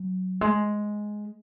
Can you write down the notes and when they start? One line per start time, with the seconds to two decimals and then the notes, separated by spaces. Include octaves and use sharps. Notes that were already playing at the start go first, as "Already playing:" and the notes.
Already playing: F#3
0.41 G#3